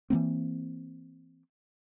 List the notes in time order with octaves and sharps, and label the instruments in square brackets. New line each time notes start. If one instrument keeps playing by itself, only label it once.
[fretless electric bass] E3 F3 A#3 C4